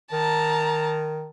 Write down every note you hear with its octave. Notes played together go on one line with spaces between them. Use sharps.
D#3 A5 A#5